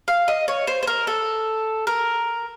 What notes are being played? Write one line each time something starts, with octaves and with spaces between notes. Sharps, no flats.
F5
D#5
C#5
C5
C5
A#4
A4
A#4